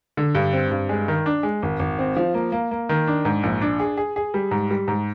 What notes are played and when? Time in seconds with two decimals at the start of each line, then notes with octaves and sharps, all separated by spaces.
0.17 D3
0.35 G2
0.53 C4
0.71 G2
0.89 G#3
1.08 D#3
1.26 D4
1.43 G#3
1.62 G#1
1.79 G#1
1.99 C4
2.16 F3
2.34 A#3
2.52 A#3
2.71 A#3
2.89 D#3
3.07 D4
3.25 G#2
3.43 A#1
3.62 D4
3.80 G#4
3.97 G#4
4.16 G#4
4.34 G3
4.51 G#2
4.71 G3
4.88 G#2